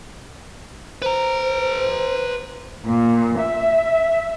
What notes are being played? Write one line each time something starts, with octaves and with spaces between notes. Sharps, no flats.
B4 C5 A#5
A#2
E5